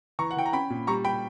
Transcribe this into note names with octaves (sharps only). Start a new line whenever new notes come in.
E3 A#5 C#6
F#5
E3 G5
A#5
C#4 G5 B5
A#2
G3 A#5 C#6
G3 G5 B5